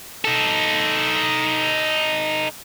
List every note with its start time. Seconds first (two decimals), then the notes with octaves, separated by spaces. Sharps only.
0.25 D#4 A4